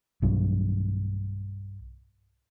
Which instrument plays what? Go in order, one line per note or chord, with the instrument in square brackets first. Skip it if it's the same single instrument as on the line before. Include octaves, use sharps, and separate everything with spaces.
[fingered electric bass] B1 G2 F#3